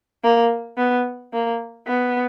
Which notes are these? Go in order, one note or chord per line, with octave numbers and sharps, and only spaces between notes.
A#3
B3
A#3
B3